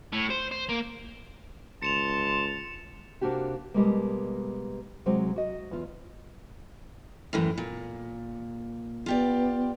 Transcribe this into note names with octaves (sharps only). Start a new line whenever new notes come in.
A2
C5
C5
A#3
C#2 A5 C6 C#7 E7 F7
C3 A#3 D4 F#4 G4
B2 G3 G#3 A#3
C3 F#3 G#3 C4
F#4 D#5
E2 F4
F#2 A2 E3
A#2
B3 F4 G4 D5